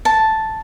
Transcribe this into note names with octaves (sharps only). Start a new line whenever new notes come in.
A5